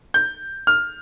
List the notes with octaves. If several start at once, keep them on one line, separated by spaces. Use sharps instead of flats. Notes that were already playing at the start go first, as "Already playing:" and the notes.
G6
F6